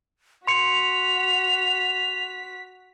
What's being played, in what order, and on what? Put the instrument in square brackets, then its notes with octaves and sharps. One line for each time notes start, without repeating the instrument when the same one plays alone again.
[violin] F#4 B6 [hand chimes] C6 C#7 [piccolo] F7